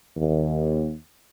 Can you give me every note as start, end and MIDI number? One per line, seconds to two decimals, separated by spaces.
0.17 0.94 39